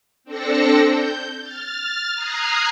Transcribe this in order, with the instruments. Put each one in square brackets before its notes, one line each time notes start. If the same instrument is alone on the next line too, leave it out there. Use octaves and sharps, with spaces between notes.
[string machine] C4 D4 A4 E6 A#6 C#7
G6
F6 A6
A#5 D#6 F6 F#6 G#6 C7